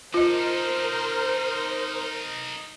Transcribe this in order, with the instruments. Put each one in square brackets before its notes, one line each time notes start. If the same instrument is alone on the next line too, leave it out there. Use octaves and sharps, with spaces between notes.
[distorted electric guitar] D#4 A4 [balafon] F4 D#5 [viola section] A#4 C5